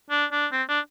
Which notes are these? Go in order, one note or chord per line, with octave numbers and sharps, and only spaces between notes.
D4
D4
C4
D4